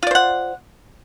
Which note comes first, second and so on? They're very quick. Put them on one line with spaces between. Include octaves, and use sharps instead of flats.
F4 D5 C5 F#5